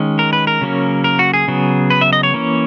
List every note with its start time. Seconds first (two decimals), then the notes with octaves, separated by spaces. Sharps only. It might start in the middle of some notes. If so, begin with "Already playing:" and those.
Already playing: D#3 G#3 C#4
0.19 A#4
0.33 B4
0.47 A#4
0.61 C#3 F#3 A#3 C#4
1.04 A#4
1.19 F#4
1.34 G#4
1.48 C#3 F#3 B3
1.90 B4
2.01 E5
2.13 D#5
2.23 C#5
2.34 E3 A#3 C#4